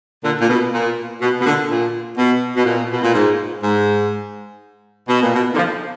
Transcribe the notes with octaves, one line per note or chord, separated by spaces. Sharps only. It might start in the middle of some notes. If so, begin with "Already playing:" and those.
A#2 D3
A#2
B2
A#2
B2
B2
A#2 D3
A#2
B2
B2
A#2
B2
A#2
G#2
G#2
B2
A#2
B2
D#3
D3 F3